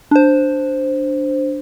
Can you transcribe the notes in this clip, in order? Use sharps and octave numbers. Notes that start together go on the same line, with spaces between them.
D4 C5